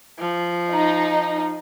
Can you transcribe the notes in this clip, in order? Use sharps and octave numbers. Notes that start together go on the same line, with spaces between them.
F3
D#4